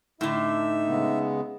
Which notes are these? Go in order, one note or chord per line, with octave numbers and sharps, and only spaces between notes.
A2 D3 D#4 E5
C#3 G#3 B3